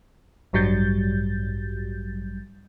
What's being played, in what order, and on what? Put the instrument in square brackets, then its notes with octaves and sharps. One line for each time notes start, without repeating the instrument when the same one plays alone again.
[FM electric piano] A1 G2 F#3 G3 G6 A6